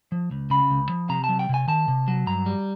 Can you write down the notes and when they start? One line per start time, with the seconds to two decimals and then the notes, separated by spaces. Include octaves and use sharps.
0.12 F3
0.31 C#2
0.50 C#3 B5
0.70 C#2
0.89 F3
1.09 C3 A#5
1.24 A5
1.29 F#3
1.39 G5
1.49 C3 G#5
1.68 D#3 A5
1.88 C3
2.08 F#3
2.26 G2 A#5
2.46 G3